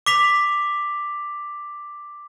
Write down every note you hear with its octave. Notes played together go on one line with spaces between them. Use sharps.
D6 B6 F7